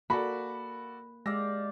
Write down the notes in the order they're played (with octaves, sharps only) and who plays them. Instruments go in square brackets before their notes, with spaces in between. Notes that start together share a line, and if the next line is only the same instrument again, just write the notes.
[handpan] A#3 [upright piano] F#4 A4 D5 [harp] B5
[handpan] G#3 [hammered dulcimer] G4 D5 F5 [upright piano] E6 A#6